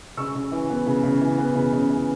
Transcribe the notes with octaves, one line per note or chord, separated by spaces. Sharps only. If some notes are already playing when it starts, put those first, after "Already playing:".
C#3 C#6 E6
C#3
E3
B3
C#3
C#3
E3
B3
C#3
C#3
E3